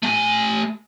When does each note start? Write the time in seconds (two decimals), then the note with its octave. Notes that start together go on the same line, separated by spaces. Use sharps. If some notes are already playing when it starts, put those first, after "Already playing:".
0.03 A3 G#5